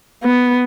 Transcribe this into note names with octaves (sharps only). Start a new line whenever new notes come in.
B3